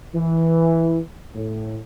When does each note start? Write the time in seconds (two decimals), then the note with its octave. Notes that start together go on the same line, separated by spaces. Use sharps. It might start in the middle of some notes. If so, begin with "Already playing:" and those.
0.15 E3
1.35 A2